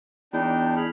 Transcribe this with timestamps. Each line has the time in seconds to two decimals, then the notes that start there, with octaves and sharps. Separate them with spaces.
0.33 E2 D4 D#4 G5
0.76 G#4 B5 F6